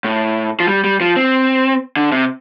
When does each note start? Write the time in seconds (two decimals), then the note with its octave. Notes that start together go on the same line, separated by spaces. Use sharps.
0.04 A2
0.60 F3
0.68 G3
0.84 G3
1.01 F3
1.16 C4
1.97 D3
2.12 C3